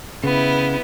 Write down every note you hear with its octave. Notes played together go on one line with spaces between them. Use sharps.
C#3 B3 E4